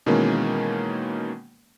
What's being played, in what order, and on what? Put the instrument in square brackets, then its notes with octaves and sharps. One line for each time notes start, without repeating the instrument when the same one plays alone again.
[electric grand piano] B2 D#3 E3 G#3 A#3 C#4